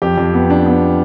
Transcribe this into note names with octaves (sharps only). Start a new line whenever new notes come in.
F2 G4
F2
B3
D4
B3